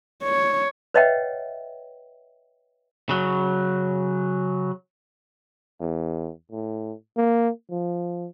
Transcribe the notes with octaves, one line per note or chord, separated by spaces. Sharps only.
C#5
B4 C#5 D#5 E5 F#5 G5
C#3 F#3
E2
A2
A#3
F3